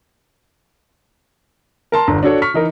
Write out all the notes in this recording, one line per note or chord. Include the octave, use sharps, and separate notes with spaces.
A#4 A5 C6
G1 D3 A#5
D4 F#4 A4 C#5 D5
C#6 F6 B6
E3 D#4 A#4